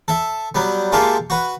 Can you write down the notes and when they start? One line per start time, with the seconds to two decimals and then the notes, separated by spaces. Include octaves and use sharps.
0.08 A4 E5
0.55 F#3 G3 B3
0.92 G#3 A#3 F4 G4 A4 E5
1.30 F#4 B4